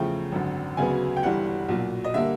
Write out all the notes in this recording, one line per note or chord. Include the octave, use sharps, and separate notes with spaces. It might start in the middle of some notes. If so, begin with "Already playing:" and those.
Already playing: E2 C#3 F3 A3 G5
G#1 F#2 D3
D2 C#3 F#3 B3 G#5
G5
G1 G2 E3 G3 F#5
B1 A#2 F#3
D#5
D3 G3 A#3 E5